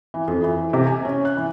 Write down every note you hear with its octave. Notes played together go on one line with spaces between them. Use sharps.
E3
F2
E3
C3
G#5
C#4
F#6
E3